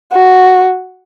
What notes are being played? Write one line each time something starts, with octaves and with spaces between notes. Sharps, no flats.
F#4